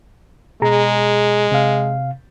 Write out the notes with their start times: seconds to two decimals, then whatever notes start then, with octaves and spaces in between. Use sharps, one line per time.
0.62 B2 G#3 G#4 A#5
1.51 C3 F5